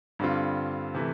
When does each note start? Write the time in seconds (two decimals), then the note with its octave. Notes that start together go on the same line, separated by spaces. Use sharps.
0.19 G2 D3 G3 C4 F4
0.95 C3 E3 A3